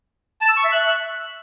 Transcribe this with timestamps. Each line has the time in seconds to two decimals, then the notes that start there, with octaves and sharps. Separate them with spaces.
0.41 A5
0.49 E6
0.57 C#6
0.64 E5
0.72 F#6